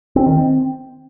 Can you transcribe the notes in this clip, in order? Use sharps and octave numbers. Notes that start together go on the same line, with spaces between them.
C4
D#3
C4